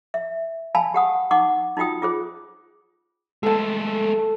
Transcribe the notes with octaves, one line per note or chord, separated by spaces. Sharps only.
E5
F5 G#5 A5 B5
G4 F#5 D#6
D#4 F#5 C#6 D6
D#4 F4 F#4 G5 D#6
F4 G#4 C5
G#3 A3 A4 A5